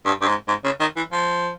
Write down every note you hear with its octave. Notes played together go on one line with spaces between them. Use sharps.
G2
G2
G#2
G#2
C#3
D#3
E3
F3